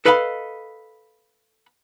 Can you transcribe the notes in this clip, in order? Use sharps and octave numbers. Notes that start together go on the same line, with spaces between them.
A4 B4 D#5 F5 G#5 B5